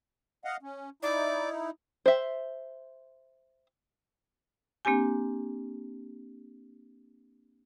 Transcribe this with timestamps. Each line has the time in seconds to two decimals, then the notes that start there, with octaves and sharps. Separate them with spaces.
0.45 D#5 F5 F#5
0.63 C#4
1.03 D#4 E4 D5
2.06 C5 E5
4.85 A#3 C4 D4 G4 G#5